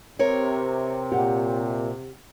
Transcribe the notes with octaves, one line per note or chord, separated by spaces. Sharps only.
C3 A#4 C#5
A#2 G4 F#5